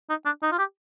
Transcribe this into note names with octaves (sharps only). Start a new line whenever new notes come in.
D#4
D4
D#4
F4
G4